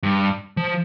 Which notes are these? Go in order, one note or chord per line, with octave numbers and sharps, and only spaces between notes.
G2
F3